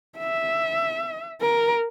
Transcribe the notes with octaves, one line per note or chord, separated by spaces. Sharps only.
E5
A#4